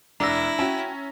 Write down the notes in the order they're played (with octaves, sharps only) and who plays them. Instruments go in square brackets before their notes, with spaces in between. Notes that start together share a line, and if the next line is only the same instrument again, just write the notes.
[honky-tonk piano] F1 E6 [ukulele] D4 [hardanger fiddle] E4 [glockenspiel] A#5 A#6
[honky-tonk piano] C#4 [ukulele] F#4 G5 A5